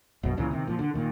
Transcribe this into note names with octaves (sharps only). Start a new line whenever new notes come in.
A#1 F#2 B2
C#2 A#2 C#3 E3
C3 D#3
A#2 F3
D3
A#2 D#3